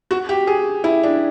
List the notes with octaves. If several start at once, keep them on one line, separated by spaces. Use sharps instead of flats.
F#4
G4
G#4
E4
D4